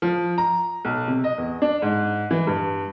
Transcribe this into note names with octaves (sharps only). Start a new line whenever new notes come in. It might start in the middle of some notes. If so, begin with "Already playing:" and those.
F3
A#5
B1
C3
D#5
E2
D4
G#2
E3
G2